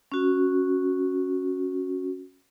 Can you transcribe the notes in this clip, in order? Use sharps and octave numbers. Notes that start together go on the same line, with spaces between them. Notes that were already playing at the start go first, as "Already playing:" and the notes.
C#4 F#4